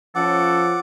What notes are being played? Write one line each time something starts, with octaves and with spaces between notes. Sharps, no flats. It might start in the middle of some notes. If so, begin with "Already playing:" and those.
F3 C#4 A4 F#5 D6